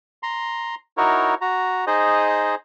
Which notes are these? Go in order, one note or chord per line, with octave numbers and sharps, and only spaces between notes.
A#5 C6
D#4 E4 F#4 A#4 C#5
F#4 A#5
D#4 G#4 C5 D#5